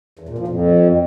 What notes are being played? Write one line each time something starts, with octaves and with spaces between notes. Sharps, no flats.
E2
A#2
F3
F2